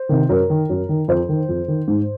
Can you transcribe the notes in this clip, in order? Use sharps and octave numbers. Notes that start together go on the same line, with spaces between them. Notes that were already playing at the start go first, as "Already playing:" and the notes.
Already playing: C5
C3 D#3
F#2 A#4
D#3
F#2
D#3
F2 C5
D#3
F2
D#3
G#2